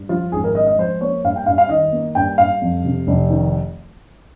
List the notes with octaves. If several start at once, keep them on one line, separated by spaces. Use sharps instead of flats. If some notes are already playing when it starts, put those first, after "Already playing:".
Already playing: G2
F3 F4
G#1 G#4
A#4
G#3 D#5
D#5
F3 C5
A#3 C#5
G2 F5
G5
G2 F5
F5
D#3 D#5
A#3
G2 G5
G2 F5
F2
C3
F1
D#3